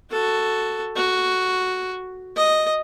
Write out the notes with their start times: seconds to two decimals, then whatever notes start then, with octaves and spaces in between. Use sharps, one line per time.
0.11 F#4 A4
0.96 F#4
2.37 D#5